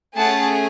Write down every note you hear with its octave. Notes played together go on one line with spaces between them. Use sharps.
A3 C#4 G#4 F#5 A5